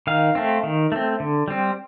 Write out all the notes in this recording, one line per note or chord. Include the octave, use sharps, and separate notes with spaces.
D#3 F5
A3 C4
D#3
A3 C4
D3
G3 C4